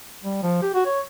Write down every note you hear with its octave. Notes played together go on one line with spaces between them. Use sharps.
G3
F3
G4
F#4
C#5